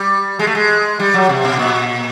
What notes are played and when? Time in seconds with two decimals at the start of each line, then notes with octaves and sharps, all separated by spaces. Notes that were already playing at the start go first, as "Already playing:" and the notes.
Already playing: G3
0.39 G#3
0.47 A3
0.55 G#3
0.99 G3
1.14 F#3
1.29 C3
1.45 B2
1.59 A#2